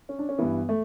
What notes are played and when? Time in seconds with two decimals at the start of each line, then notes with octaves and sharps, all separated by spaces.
0.09 C#4
0.19 D4
0.29 C#4
0.38 G2 E3 B3
0.69 A3